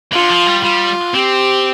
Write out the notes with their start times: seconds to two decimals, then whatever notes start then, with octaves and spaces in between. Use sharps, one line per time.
0.12 D3 F4
0.30 F3
0.47 G3
0.63 G3 F4
1.14 C4 G4